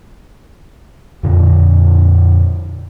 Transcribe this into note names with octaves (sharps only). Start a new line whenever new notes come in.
F2 A#2 D3